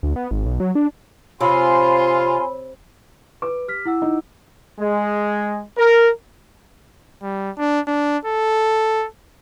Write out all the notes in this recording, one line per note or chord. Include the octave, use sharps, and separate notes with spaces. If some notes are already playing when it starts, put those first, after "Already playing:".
D2
B3
G#1
B1
F#3
D4
C3 F4 C#5 G#5 B5 C6
B4 D6
G4 F6 B6
E4 F#5 E6
D#4
G#3
A#4
G3
D4
D4
A4